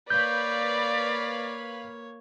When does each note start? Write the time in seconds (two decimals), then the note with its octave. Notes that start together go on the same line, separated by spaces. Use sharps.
0.10 A#3 B4 C#5 D5 F5 B5 G6